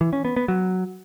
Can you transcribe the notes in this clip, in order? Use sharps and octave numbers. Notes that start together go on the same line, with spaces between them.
E3
C#4
B3
B3
F#3